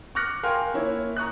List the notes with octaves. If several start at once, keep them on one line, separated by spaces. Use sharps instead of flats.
C#6 D6 F6 F#6 A#6 C#7
A#4 F5 G5 G#5 C6
A#3 E4 C#5
A#5 C#6 D#6 F#6